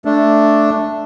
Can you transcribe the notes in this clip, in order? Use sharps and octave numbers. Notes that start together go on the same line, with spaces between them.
A3 D4